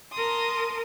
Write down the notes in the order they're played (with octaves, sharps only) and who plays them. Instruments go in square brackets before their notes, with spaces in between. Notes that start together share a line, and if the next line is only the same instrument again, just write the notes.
[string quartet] A#4 A5 C6 D#6